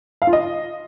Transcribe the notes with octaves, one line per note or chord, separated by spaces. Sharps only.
F5
F4
D#5